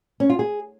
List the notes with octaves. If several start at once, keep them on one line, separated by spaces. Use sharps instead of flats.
C#4
F4
G#4